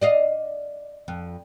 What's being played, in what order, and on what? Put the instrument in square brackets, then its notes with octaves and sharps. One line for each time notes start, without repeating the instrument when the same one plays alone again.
[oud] D5 D#5 F5
F2